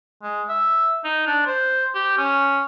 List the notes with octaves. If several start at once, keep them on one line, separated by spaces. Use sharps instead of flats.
G#3
E5
D#4
D4
C5
G4
C#4